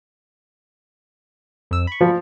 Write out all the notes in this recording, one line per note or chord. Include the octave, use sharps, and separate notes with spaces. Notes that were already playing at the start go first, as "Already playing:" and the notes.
F2 E6
B5 C#6
F3